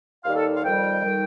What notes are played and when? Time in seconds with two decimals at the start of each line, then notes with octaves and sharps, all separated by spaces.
0.24 D#2 D#3 G3 F5
0.34 A4
0.55 F5
0.64 F2 D#3 G3 G5
1.04 D#3 G3